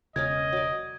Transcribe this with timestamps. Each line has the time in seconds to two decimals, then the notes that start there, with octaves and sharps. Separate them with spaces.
0.16 E1 C#3 A#3 C#4 A#4 D#5 G#6
0.53 F#3 D5